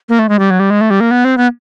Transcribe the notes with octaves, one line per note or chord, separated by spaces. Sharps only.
A#3
A3
G#3
G3
F#3
G3
G#3
A3
G3
A#3
B3
C4
B3